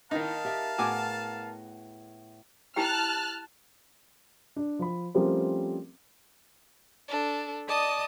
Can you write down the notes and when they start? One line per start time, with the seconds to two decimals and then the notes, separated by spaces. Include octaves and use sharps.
0.11 D#3 D#4 E4 A#4 D#5 F5 A5
0.45 G4 E5
0.78 A2 B3 F#4 G#4 G#5 D6
2.76 E4 G4 G5 A5 F6 F#6
4.56 D4
4.79 F3 B5
5.14 F3 G3 A3 C4 C#4 A#4
7.07 D4 A4
7.68 D5 D#5 A5 D#6